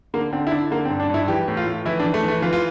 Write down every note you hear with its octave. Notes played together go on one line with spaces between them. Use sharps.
D3 A#3
D3 C4
E4
D3 D4
D3 A#3
C4
G2
D4
G2 E4
E3 G4
A2
F4
A2
E3 E4
D4
E3
A3
E3
A3
E3 F4
F4